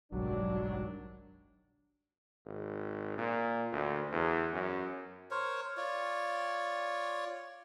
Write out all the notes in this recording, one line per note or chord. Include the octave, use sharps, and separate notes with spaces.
F#1 B1 G#2 D#3 F#3 G3 D4
G#1
A#2
D2
E2
F#2
A#4 C5 C#5
F4 C#5 D5